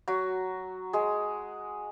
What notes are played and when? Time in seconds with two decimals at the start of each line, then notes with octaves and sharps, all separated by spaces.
0.08 F#3 F#4
0.93 G#3 G#4